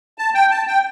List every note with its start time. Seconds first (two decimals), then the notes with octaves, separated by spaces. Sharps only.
0.18 A5
0.34 G5
0.51 A5
0.67 G5